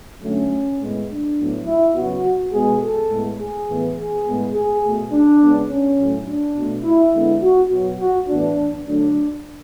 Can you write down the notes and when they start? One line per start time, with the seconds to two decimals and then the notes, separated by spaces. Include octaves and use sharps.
0.21 D3 F#3 A3 C#4
0.78 A2 G#3 B3
1.08 D4
1.36 A2 F#3 B3
1.65 E4
1.94 C#3 F#3 B3 F#4
2.52 B2 G#3 B3 G#4
2.80 A4
3.09 A2 G#3 B3
3.38 G#4
3.67 A2 E3 B3
3.96 G#4
4.24 A2 G#3 B3
4.53 G#4
4.82 B2 A3
5.11 D4
5.40 C#3 G#3 B3
5.68 C#4
5.97 A2 F#3 A3
6.26 D4
6.55 B2 A3
6.83 E4
7.13 D3 G#3 B3 E4
7.41 F#4
7.70 B2 F#3 B3 F#4
7.99 F#4
8.27 A2 E3 B3 D4
8.85 D3 F#3 A3 D4